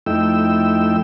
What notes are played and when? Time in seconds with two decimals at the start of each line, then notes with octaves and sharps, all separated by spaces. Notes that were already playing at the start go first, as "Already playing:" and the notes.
0.06 F2 A3 D#4 E4 G5 E6